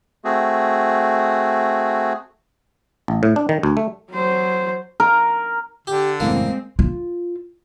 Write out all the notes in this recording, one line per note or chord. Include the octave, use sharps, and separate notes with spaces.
A3 C4 F#4 G#4
A1
A2
D4
D#3
D2
A3
F#3 C5
A#4
D3 G4
F#1 E2 A2 G#3 A#3 C4
F4